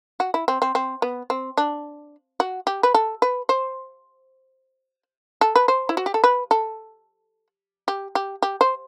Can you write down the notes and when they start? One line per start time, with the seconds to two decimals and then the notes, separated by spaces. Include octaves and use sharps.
0.20 F#4
0.34 E4
0.48 C4
0.62 C4
0.75 C4
1.02 B3
1.30 C4
1.58 D4
2.40 F#4
2.67 G4
2.83 B4
2.94 A4
3.22 B4
3.49 C5
5.41 A4
5.56 B4
5.68 C5
5.89 E4
5.97 F#4
6.06 G4
6.14 A4
6.24 B4
6.51 A4
7.88 G4
8.15 G4
8.42 G4
8.61 C5